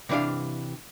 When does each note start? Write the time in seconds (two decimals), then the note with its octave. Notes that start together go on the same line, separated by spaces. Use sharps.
0.09 C3 E3 D4 D5 F5